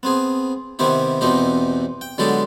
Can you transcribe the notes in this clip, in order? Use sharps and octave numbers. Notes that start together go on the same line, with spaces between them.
B3 C4 G#4
C3 D#3 B3 C4 E4 G4
E2 B2 E3 C4 D#4 G4
G5
D3 F#3 G#3 B3 G4 A4